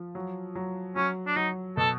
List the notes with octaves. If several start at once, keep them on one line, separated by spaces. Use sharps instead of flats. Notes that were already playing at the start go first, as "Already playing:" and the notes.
Already playing: F3
F#3
F#3
F#3 C#4
D4
F#3 D#4
B2 A4